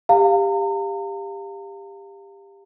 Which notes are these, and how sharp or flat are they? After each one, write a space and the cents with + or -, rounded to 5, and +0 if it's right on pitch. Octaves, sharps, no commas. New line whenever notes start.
G4 +20 F5 +0 A#5 -40